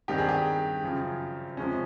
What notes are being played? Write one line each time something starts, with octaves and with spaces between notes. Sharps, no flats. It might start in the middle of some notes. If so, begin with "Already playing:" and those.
G2 D#3 G3 C4 D#4 G4
G#4
G4
F#2 C#3 F3
C3 F3 G#3 C#4